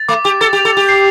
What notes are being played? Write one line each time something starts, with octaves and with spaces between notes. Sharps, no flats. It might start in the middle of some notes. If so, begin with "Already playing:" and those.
Already playing: A6
A3 D6
G4 D6
A4 A6
G4
F7
A4
G4 A6
C7